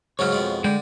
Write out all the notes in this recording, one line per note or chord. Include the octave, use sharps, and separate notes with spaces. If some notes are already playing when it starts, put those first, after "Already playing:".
G#2 C#3 F#3 C#5 F5
F2 B2 G#3
D3 G#3 G5